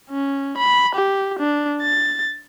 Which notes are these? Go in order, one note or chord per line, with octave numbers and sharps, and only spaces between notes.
C#4
B5
G4
D4
A6